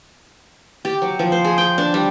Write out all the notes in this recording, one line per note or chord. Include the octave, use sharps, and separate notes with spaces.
G4
F#3
F3
C5
G#4
G5
D4
G3